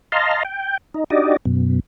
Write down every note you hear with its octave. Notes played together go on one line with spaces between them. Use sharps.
D#5 F5 A5 A#5 C6
G5
D#4
D4 D#4 F#4 G4 D5 D#5
F#2 B2